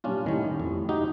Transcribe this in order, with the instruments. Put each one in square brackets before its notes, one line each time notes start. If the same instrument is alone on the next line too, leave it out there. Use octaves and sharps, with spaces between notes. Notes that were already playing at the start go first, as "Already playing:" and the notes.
[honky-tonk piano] A#2 G3 [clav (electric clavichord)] C#4 D4 F4
[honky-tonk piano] A2 G3 [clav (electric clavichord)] D#3 C#4
[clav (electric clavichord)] F2
[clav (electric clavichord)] D#4 G4 [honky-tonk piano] F#4 F#5